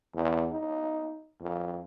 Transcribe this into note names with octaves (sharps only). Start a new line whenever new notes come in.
E2
D#4
F2